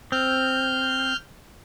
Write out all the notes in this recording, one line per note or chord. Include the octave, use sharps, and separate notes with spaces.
C4 F6 G6